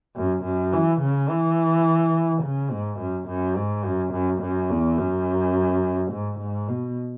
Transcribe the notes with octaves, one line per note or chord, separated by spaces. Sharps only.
F#2
F#2
E3
C#3
E3
C#3
G#2
F#2
F#2
G#2
F#2
F#2
F#2
E2
F#2
G#2
G#2
B2